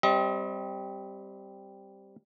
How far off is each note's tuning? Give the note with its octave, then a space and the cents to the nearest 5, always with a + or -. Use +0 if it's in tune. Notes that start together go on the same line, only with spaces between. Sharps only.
G3 +0 C4 +0 D#5 +40